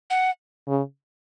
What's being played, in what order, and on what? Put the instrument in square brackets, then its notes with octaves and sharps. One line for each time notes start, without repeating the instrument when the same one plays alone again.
[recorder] F#5
[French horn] C#3